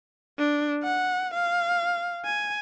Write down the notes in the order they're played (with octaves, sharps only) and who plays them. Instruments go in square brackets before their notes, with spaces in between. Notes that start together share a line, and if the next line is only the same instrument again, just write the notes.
[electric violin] D4
F#5
F5
G#5